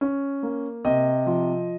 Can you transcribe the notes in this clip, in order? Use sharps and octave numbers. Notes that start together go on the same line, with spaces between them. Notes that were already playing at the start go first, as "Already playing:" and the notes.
C#4
A#3
C3 D#5
F3